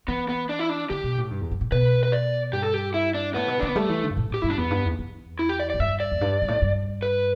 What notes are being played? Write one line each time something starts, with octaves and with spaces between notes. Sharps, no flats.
E3 B3
B3
D4
E4
D4
D3 G4
B2
A2
G2
E2
G2
A2
B2 B4
B4
D5
G2 G4
A4
G4
E4
D4
A2 B3
B2
D3 D4
B3
G3 A3
E3
D3
G2
A2
A2 G4
G2 E4
D4
E2 B3
G2
E2
E2
E4
G4
D5
A2 D5
G2 E5
D5
E2
G2
G2
A2
G2
B4